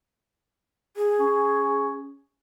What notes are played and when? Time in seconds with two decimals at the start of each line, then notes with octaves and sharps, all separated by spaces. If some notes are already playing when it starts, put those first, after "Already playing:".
0.96 G#4
1.19 C#4